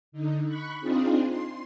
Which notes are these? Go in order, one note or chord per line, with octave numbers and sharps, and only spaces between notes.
D3 D#4
B5 C#6 F#6
C4 D4 D#4 F4 G#4
C6